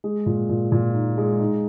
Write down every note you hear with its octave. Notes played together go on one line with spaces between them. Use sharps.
G#3
A#2
A#2
A#2
D#4
G#3
D#4